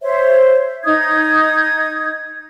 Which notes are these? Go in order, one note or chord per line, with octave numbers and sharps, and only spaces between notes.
C5 C#5 E5
D#4 D#6 G#6